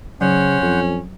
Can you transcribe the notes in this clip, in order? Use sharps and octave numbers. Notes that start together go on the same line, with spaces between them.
C#3 F#3 C#4 C5 F#5
F2